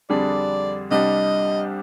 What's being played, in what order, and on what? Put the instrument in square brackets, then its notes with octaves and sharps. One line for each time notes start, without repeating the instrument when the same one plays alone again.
[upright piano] F2 D3 G3 D4 G#4 [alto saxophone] D5
[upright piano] C2 C3 G3 D4 G4 [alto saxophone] D#5